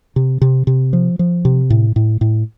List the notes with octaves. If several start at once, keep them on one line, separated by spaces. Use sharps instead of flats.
C3
C3
C3
F3
F3
C3
A2
A2
A2